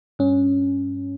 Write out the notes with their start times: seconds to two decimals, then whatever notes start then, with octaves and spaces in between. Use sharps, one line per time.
0.19 G2 C#4